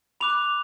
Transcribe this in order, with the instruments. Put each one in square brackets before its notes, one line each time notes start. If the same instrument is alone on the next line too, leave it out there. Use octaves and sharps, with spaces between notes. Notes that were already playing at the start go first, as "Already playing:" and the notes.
[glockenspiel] B5 D6 F#6 F7